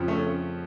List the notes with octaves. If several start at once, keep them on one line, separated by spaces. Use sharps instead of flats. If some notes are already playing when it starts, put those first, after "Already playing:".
Already playing: F2 C#3 F3
A3 C#4